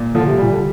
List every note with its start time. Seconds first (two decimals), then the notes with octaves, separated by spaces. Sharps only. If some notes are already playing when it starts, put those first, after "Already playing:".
Already playing: A#2
0.14 D3 F3
0.26 C3
0.37 A#2 G3
0.51 D3